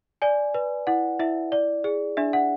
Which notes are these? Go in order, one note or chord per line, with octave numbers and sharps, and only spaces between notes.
D5 G#5
B4
E4 F#5
E4 E5
D5
G#4
D4 E5
F#5